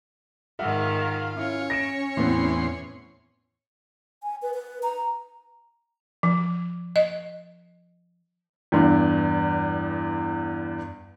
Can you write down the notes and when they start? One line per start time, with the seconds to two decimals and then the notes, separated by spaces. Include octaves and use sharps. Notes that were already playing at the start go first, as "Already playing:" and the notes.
0.59 G#2 D#3 F4 E5 F#5
1.37 C#4 E4 C#5
1.70 A#6 D7 E7
2.17 E2 A2 B3 C4 C6
4.23 G#5
4.42 B4
4.54 B4
4.83 A#5
6.23 F3
6.96 D#5
8.72 E2 G2